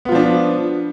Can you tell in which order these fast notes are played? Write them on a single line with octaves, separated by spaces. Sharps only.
B3 F4 F3 D4